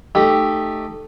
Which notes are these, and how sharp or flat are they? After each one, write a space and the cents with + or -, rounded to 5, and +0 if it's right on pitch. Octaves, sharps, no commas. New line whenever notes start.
A3 +0 D#4 -15 G4 +0